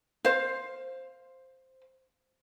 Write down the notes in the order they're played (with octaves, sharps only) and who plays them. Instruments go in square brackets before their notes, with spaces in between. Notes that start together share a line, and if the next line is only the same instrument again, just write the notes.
[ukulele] C5 F5